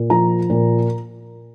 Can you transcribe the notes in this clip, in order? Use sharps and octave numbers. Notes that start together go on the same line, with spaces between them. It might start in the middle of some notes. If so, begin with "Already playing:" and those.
Already playing: A#2
F3 A#5
A#2